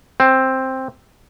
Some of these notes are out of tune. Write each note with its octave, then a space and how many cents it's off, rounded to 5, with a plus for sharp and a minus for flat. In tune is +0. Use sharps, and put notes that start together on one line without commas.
C4 +5